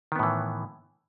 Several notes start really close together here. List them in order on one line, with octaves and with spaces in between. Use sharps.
D#3 B3 A2 E3